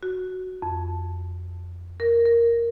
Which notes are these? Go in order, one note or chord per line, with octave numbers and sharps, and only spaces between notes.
F#4
F2
A#4
A#4